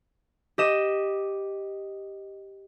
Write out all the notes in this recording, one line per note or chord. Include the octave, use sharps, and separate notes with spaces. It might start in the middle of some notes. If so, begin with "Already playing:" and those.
G4 D#5 E7